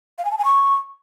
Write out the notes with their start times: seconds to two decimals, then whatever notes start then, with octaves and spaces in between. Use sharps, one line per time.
0.18 F5
0.25 G#5
0.32 A5
0.38 G#5
0.45 C#6